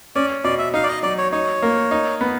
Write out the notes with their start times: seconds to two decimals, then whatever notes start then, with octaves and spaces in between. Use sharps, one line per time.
0.16 C#4 D5
0.44 B2 D5
0.59 E5
0.74 D#4 F5
0.83 D5
0.89 D#5
1.03 F#3 D5
1.18 C#5
1.32 D#4 C#5
1.62 A#3
1.91 D#4
2.21 B3